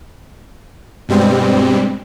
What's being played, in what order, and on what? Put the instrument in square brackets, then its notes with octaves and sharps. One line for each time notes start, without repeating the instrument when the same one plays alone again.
[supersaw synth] G2 B2 G3 G#3 C4